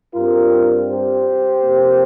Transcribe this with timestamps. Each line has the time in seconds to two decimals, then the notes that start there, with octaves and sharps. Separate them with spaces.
0.15 G2 G3 C4 F4 A#4
0.88 G4 C5
1.63 F2 C3 A#3